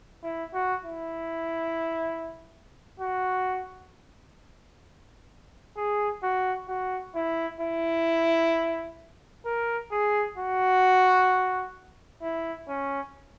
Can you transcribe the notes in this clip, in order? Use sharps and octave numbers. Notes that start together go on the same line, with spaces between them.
E4
F#4
E4
F#4
G#4
F#4
F#4
E4
E4
A#4
G#4
F#4
E4
C#4